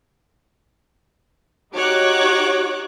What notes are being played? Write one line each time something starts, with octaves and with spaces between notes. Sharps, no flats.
D#4 F#4 G4 C#5 D6 F#6